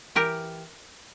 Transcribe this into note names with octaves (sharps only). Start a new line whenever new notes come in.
E3 G4 A#4